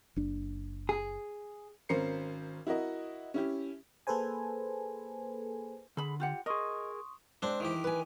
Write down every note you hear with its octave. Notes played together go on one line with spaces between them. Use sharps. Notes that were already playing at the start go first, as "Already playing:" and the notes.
F#1 D4
G#4
G#1 C#4 A#4 C5 C7 C#7
E4 F#4 A#4 D#5
C#4 E4 G4
A#3 G#4 A4 B4 C5 G#5
D3 G#4 B5
F4 G4 F#5
G#4 A#4 D#5 C6 C#6 D#6
G#3 C4 D4 C5
D#3 E3 G4
B4 G#5